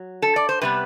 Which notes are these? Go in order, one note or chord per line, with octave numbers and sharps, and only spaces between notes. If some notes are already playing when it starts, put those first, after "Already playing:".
Already playing: F#3
A4
D5
C5
C3 G3 B3 B4